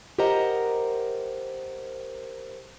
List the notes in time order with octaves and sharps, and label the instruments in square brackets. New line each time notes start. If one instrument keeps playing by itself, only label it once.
[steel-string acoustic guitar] G4 A#4 C5 D#5 F#5 A#5